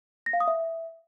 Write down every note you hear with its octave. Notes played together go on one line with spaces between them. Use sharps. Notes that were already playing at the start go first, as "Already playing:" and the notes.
A#6
F5
D#6
E5